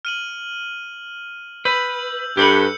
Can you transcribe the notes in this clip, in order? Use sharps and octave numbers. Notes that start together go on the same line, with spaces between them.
F6 D#7 F#7
B4 E6 G6 F#7
G2 G4 A4 B4 G6 C#7